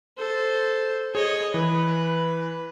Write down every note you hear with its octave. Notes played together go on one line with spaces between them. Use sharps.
A4 C5
G#4 C#5 D#5
E3 B4